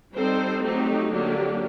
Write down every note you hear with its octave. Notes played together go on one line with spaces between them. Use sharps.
G3 C4 D#4 A4 C5
F#3 A3 C4 D#4 G4
D3 F#3 A#3 D4 G4